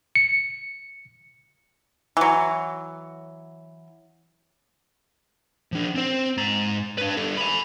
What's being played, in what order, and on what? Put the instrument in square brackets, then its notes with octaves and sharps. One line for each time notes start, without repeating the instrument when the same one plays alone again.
[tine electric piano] C#7
[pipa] E3 F#3
[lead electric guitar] F3 D4
C4 C5
G#2 A#5
D4 B4
G3 A4
G#5 B5